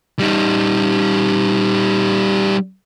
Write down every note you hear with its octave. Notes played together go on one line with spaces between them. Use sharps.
G3 D#4